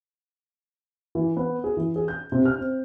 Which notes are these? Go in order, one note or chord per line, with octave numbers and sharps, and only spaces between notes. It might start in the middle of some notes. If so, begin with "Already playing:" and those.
E3
B3
G#4
E3
G#4
G6
C3
F6
C4